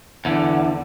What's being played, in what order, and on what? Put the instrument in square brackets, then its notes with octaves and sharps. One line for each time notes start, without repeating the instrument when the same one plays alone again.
[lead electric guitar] E2 D3